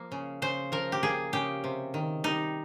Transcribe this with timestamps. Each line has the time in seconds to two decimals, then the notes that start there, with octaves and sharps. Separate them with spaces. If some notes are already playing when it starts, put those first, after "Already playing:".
Already playing: F3 A#3
0.12 C#3
0.42 C#3 C5
0.72 F3 A#4
0.92 G4
1.03 A#3 G#4
1.33 C#3 G4
1.64 C3
1.94 D#3
2.24 G3 D#4